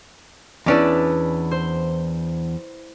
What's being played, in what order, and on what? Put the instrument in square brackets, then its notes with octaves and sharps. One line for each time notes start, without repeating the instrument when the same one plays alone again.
[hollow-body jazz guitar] E2 C#4 D4 [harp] E4 B4 D5
[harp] C5